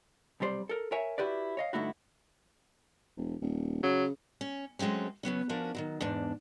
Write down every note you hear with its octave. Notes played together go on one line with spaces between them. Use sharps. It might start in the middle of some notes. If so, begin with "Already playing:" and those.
B1 C3 G3 C5 D5
A4 A#4
A#4 C#5 E5 G#5
E4 F#4 G4 B4 D5
C#5 D#5 F5
G2 D3 A3 D#4 E4 F#4
E1
D#1
C#3 F#3
C#4
F#3 G#3 A3 C4 C#4
C#3 F#3 B3 C#4
F3 C#4 D4 F#4 A#4
D#3 E3 F#3
E2 G#2 D4